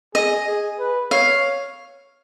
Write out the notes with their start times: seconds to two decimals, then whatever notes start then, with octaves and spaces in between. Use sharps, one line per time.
0.15 G#4 D#5
0.47 G#4
0.79 B4
1.11 C#5 F5